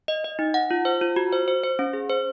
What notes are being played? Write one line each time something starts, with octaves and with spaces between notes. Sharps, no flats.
D#5
D#5
D#4
F#5
F4
C5
F4
F#4
C5
C5
C5
C#4
G#4
C5